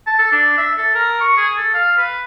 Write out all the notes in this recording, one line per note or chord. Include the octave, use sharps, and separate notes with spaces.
A5
A4
D4
E5
A4
A#4
C#6
G#4
A4
F5
B4